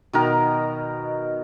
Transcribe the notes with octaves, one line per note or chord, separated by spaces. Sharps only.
B2 D#3 A#4